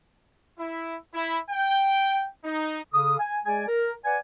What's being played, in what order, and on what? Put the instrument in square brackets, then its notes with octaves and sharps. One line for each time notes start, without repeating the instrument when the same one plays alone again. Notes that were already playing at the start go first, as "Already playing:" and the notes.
[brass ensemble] E4
E4
G5
D#4
[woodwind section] C#3 A4 F5 D#6
G#5
G#3 G#4 D5 G#5
A#4
B4 D5 F#5 G#5